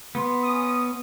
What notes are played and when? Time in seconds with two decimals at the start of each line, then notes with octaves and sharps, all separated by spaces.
0.15 B3 C6
0.44 C#4 D#6